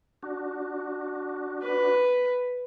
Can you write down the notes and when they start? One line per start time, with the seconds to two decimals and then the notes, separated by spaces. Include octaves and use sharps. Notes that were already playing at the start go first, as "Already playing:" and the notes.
0.23 D4 F#4
1.63 B4